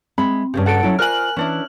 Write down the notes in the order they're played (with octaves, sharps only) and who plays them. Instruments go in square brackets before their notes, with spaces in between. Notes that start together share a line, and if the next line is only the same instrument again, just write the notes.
[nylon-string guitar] G#3 E5 [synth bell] C4 [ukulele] B5
[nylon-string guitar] G2 A#2 C#3 [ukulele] C#4 G4
[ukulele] F#4 A4 [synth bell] F#5 D7
[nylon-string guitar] F#3 C#4 E4
[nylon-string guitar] F4 C5 D5 [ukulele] A#4 G#5 [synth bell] F6 F#6 F#7
[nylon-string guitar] E3 [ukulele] C#4 D4 E4